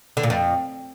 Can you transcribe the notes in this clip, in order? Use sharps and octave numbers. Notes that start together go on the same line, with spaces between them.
D3
A#2
F2